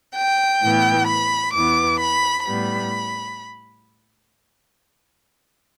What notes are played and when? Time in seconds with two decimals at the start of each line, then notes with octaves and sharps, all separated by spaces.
0.14 G5
0.61 A2 E3 B3
1.07 B5
1.53 E2 E3 B3 D6
1.99 B5
2.45 A2 G3 B3 B5